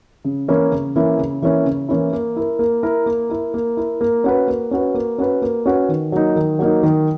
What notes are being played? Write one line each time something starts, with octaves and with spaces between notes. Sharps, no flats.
C#3
E3 A#3 C#4 E4
C#3
E3 A#3 C#4 E4
C#3
E3 A#3 C#4 E4
C#3
E3 A#3 C#4 E4
A#3
E4 A#4
A#3
E4 A#4
A#3
E4 A#4
A#3
E4 A#4
A#3
C#4 F#4 B4
A#3
C#4 F#4 B4
A#3
C#4 F#4 B4
A#3
C#4 F#4 B4
D#3
F#3 A#3 D#4
D#3
F#3 A#3 D#4
D#3